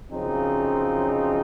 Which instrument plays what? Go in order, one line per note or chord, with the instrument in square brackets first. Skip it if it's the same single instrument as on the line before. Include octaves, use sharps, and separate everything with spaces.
[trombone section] F#2 C#3 F3 C4 D#4